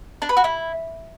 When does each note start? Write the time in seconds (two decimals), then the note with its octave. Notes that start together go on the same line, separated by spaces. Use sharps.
0.22 D4
0.29 B4
0.37 F#4
0.44 E4